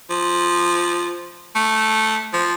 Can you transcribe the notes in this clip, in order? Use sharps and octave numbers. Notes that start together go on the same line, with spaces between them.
F3
A3
F3